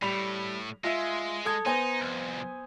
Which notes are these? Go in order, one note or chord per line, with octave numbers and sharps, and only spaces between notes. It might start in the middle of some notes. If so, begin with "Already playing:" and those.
A2 G3 B5 F7
G#3 F4 E5
A4 D#6 G#6
B3 D#4 C5 G#5
C2 F2